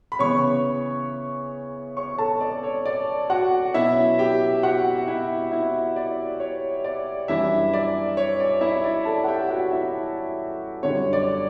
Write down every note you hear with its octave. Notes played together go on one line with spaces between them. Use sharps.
B5
C#3 E3 B3 C#5 C#6
C#5 C#6
A4 A5
D5
C#5
D5
F#4 F#5
B2 F#3 C#4 E4 E5
G4 G5
F#4 F#5
E4 E5
E4 E5
D5
C#5
D5
F#2 E3 G3 D4 E4 E5
D5
C#5
D5
E4 E5
D5
A4 A5
F#5
G4 G5
F#4 F#5
E4 E5
F#2 D3 G3 C#5
D5